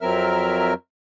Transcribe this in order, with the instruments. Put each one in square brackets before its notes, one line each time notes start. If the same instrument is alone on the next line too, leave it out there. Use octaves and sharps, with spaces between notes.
[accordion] F2 F#3 C4 A#4 E5 F6